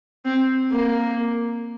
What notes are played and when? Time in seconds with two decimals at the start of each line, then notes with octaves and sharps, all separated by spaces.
0.26 C4
0.72 A#3